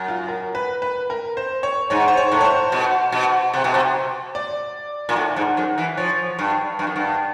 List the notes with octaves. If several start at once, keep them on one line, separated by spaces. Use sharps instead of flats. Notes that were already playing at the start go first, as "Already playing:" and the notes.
Already playing: F#2
F4
A#4
B4
B4
A#4
C5
C#5
G#2 C#5
C5
C#5
A2
C#5
C5
B2
B2
C3
B2
C3
D5
A#2
A2
G#2
F#2
E3
F3 C#5
G2
G2
F#2
G2